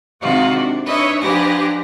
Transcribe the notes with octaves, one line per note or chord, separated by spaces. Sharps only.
C3 D#3 G#3 F4 F#4
D4
D4 D#4 B4 C#5 D#5 E5
G#2 F3 D4 G4 B4 A#6